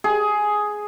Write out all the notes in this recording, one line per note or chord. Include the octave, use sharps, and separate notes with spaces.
G#4